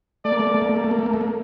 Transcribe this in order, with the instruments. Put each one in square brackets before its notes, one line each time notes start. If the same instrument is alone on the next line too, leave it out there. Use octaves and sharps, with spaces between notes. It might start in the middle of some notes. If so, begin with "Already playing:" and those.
[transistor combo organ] A3 [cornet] D5
[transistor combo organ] A#3
A3
A#3
A3
A#3
A3
A#3
A3
A#3
A3
A#3
A3
A#3